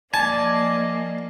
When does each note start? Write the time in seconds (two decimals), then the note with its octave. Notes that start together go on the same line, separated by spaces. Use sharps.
0.14 F3 A#3 D5 D#5 G#5 A5